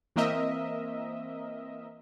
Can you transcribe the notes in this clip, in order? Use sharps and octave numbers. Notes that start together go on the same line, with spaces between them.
E3 A#3 C4 A#4 D#5 E5